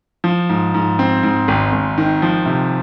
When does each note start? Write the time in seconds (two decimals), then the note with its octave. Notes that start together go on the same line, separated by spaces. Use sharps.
0.24 F3
0.49 G#2
0.74 G#2
0.99 C4
1.23 G#2
1.48 G#1
1.72 G#1
1.98 D#3
2.22 F3
2.46 C3